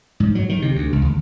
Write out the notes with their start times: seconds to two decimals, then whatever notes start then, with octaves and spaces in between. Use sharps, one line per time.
0.20 G#2
0.35 F#3
0.49 D#3
0.62 C3
0.75 D2
0.92 C#2
1.05 D#2